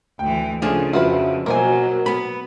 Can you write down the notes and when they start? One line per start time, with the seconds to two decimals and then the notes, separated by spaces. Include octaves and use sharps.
0.19 D2 E3 G5
0.62 C#3 F3 A3 D4 G#4
0.93 F2 F4 F#4 B4 E5
1.46 B2 F#3 A#3 A#4 C5 G#5
2.06 B3 B5